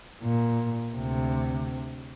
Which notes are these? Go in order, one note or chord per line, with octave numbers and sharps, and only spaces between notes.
A#2
D2 C3